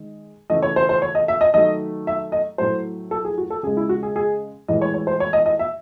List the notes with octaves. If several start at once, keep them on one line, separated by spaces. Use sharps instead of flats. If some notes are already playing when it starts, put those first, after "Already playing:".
Already playing: D#3 G#3
C#3 E3 A3 D#5
C#5
C5
C5
C#5
D#5
E5
D#5
D#3 F#3 A3 D#5
E5
D#5
A2 F#3 A3 C5
A4
G#4
F#4
A4
C#3 G#3 G#4
E4
F#4
G#4
G#4
A2 E3 G#3 D#5
C#5
C#5
C5
C#5
D#5
D#5
E5